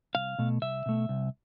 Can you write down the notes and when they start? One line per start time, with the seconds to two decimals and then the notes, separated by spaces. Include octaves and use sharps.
0.15 C2 F5
0.39 B2 A3
0.62 C2 E5
0.86 B2 A3
1.09 C2